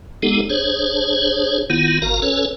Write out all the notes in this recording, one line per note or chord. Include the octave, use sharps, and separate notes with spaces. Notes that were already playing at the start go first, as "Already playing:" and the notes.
G#3 B3 D#4 G4 A4
D4 G#4 C5 C#5
D#3 B3 E4 F4
G#1 F#4 A#4 F5 A#5
C#4 A4 B4 C#5